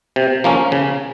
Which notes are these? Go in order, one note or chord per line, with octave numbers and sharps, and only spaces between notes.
C3
F3 A#3 C#4
C#3